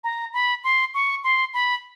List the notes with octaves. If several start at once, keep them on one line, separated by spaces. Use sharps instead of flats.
A#5
B5
C6
C#6
C6
B5